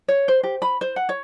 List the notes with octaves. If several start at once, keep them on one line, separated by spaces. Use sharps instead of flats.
C#5
C5
G4
B5
C5
F#5
C#5